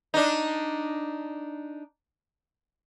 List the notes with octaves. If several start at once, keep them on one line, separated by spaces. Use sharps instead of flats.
D4 D#4